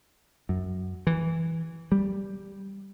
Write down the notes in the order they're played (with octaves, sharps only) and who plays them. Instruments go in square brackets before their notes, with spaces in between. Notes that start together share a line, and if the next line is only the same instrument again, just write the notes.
[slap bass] F#2
E3
G3